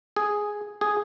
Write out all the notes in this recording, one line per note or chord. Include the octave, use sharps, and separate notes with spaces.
G#4
G#4